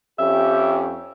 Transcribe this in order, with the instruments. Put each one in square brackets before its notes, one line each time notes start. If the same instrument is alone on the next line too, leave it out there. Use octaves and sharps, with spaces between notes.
[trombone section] F2 C#4 G4 [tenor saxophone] E5